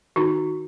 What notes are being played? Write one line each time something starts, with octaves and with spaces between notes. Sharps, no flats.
D#3 D#4 F#4